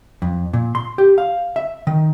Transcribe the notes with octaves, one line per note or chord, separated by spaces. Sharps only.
F2
A#2
C6
G4
F5
E5
D#3